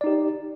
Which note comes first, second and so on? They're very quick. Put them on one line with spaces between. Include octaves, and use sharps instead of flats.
D5 D#4 G4